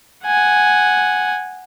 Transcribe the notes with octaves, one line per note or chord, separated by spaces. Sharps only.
F#5 G#5